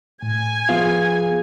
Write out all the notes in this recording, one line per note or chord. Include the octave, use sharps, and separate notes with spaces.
A2 G#5
F3 B3 F4 G#4 F5